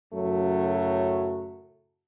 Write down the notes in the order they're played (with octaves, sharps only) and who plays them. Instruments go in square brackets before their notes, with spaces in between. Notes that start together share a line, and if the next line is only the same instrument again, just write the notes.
[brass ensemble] F#2 A2 C#3 F#3 A3